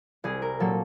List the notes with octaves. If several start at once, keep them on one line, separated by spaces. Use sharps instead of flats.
C2 G#4
A#4
A#2 F#3 A#3 A4